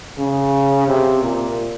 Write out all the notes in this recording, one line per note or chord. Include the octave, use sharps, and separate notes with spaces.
C#3
C3
A#2